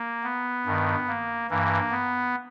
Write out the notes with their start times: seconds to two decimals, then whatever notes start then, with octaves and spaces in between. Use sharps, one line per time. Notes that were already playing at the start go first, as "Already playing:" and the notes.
Already playing: A#3
0.24 B3
0.66 G2 D#3
1.08 A#3
1.50 G2 E3 A#3
1.91 B3